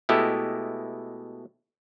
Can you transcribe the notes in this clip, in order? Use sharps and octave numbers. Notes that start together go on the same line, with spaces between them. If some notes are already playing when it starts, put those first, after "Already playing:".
B2 G#3 A3 E4 G4 A4